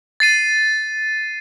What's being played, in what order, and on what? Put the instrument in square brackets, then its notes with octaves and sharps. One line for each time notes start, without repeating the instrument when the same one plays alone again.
[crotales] A6 C7 D#7